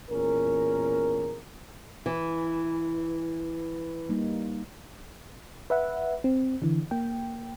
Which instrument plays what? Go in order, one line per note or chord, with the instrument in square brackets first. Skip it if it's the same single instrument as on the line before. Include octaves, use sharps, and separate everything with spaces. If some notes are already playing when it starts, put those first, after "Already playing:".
[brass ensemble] E2 A#2 C#4 A#4
[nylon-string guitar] E3 [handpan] B4
[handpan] G3 A#3 D#4
[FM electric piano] B4 E5 F#5
C4
D3 E3
A#3 G5